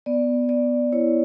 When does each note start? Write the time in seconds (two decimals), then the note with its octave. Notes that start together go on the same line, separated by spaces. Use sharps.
0.06 B3 D5
0.49 B3 D5
0.92 E4 C#5